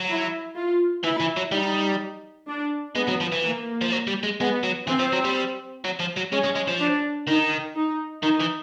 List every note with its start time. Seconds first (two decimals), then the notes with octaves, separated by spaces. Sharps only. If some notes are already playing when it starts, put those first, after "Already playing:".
Already playing: F#3
0.08 E4
0.56 F4
1.03 E3 E4
1.20 E3
1.36 F#3
1.52 G3 D#4
2.48 D4
2.96 G#3 B3
3.08 F#3
3.21 F3
3.32 E3
3.43 A#3
3.81 F3
3.92 F#3
4.07 G3
4.24 G#3
4.41 G#3 B3
4.63 F#3
4.87 E3 C4
4.99 F3
5.13 F#3
5.25 G3
5.84 F#3
5.99 F3
6.16 F#3
6.32 G#3 C#4
6.44 G#3
6.55 G#3
6.68 F3
6.80 D4
7.28 D#3 D#4
7.76 D#4
8.23 D#3 D#4
8.40 E3